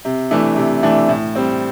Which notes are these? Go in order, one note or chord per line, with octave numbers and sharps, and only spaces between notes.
C3
E3 A3 D4
C3
E3 A3 D4
A2
G3 C4